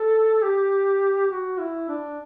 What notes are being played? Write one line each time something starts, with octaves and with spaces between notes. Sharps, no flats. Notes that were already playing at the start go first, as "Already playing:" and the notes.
Already playing: A4
G4
F#4
E4
D4